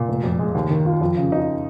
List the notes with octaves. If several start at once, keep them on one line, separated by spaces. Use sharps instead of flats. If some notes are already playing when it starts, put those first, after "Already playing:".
Already playing: A#2
F1
F2
G#3
D#2
D#3
F4
F2
C#3
D#4